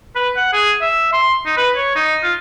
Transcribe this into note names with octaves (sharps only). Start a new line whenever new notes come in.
B4
F#5
G#4
E5
C6
D#4
B4
C#5
D#4
F4